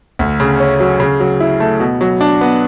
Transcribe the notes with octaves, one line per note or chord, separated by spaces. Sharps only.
D2
C#3
C#4
F#3
C#3
F#3
E4
A3
B2
F#3
D4
B3